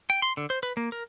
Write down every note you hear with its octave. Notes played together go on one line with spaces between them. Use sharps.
G5
C6
D3
C5
B4
A#3
A#4